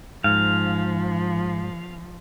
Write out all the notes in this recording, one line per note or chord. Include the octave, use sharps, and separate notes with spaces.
G#2 F3 F5